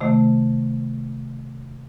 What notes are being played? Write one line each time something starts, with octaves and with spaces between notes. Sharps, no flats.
C3 D#3 A3